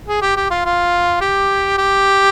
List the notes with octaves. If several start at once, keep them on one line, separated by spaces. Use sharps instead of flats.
G#4
G4
G4
F4
F4
G4
G4